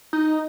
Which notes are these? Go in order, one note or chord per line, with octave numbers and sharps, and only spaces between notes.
D#4